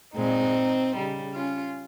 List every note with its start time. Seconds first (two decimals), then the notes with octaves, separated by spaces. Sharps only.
0.16 A#2 G#3 C4 D#4
0.95 C#3 G3
1.34 C#4 F4